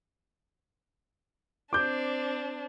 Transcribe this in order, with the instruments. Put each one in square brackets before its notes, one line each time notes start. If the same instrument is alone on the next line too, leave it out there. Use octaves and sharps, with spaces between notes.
[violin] C4 D4 [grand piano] D6 G6